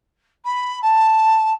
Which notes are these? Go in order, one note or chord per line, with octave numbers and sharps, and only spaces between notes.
B5
A5